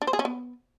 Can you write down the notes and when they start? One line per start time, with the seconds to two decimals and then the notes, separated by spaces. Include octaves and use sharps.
0.02 D4
0.07 C5
0.13 G#4
0.19 C#4
0.25 B3